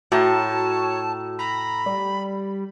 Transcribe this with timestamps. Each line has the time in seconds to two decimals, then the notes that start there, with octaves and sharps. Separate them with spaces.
0.12 A2 F#4 C#5 A5 A#5
1.39 A#5 B5
1.86 G3 D5